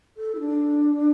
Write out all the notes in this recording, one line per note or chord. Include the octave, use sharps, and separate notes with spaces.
A4
E4
D4